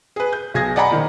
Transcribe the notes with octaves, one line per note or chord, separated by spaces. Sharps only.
G#4 B4
G6
B1 G#4 G#6 A#6
D5 D#5 F#5 G#5 A#5 B5
A#2 D#3 F3